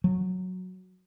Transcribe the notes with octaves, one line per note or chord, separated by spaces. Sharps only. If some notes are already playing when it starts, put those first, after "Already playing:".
F#3